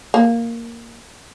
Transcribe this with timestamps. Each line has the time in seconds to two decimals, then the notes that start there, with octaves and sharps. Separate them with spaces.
0.14 A#3